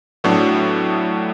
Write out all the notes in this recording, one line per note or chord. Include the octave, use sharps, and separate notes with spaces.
A2 F#3 B3 D4